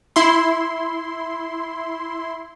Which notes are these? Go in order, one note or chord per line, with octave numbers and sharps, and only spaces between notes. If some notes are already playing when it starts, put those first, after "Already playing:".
E4 C6